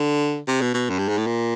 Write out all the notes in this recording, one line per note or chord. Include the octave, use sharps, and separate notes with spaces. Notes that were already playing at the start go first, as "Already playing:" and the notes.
Already playing: D3
C3
B2
B2
F#2
G2
G#2
A2
A#2